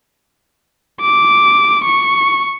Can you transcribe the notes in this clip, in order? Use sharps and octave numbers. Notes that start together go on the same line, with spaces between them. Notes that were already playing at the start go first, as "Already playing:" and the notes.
D6
C#6